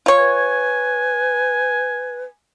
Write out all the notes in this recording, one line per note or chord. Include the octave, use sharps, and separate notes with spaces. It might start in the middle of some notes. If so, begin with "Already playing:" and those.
F4 C#5
B4 G#5